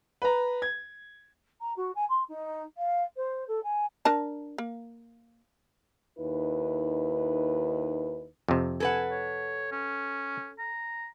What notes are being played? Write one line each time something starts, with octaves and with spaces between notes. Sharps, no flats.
B4 A#5
G#6
A#5
F#4
G#5
C6
D#4
F5
C5
A4
G#5
D4 A#4 A5
A#3
D#2 D#4 E4 B4
F2 C3
A4 B4 F#5 G#5
C#5
C#4
A#5